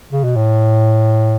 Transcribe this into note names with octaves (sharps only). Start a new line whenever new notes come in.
C#3
B2
A2